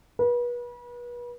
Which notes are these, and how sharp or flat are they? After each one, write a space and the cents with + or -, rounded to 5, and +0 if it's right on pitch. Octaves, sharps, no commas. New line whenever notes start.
B4 -35